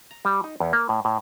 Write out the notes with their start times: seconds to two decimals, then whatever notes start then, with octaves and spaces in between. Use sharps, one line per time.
0.11 A#5
0.25 G3
0.44 D#4
0.60 E2
0.73 A#3
0.89 A2
1.05 A2